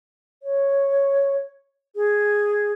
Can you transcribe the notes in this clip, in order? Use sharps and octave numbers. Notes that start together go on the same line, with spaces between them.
C#5
G#4